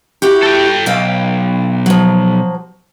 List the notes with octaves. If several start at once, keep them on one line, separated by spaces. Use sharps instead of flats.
E4 F#4 G4
A4 G5
B1 F5 G5
F3 F#3